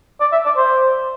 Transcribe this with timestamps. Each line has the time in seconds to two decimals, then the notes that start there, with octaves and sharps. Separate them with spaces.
0.20 D5
0.32 E5
0.45 D5
0.57 C5